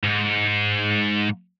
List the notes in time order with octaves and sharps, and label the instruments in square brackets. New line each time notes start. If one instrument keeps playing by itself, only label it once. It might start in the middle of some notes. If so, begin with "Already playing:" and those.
[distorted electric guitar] G#2